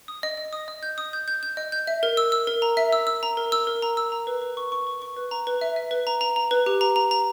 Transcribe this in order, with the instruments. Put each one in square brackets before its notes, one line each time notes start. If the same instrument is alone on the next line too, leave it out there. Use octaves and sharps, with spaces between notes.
[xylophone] D#6
D#5
D#5
D#6
D#5
G6
D#6
G6
G6
G6
D#5
G6
E5
A#4
E6
E6
A#4
A#5
E5
E6
E6
A#5
A#4
E6
A#4
A#5
E6
A#5
B4
B4
C#6
C#6
C#6
C#6
B4
A#5
B4
E5
E5
B4
A#5
A#5
A#5
B4
G4
A#5
A#5
A#5